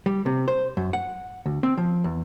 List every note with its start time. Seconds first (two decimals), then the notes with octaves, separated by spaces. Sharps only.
0.06 G3
0.26 C3
0.48 C5
0.77 F#2
0.93 F#5
1.46 D2
1.63 C4
1.78 F3
2.04 E2